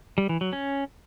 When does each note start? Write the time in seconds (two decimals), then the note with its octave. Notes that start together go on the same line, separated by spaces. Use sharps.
0.18 G3
0.29 E3
0.41 F#3
0.53 C#4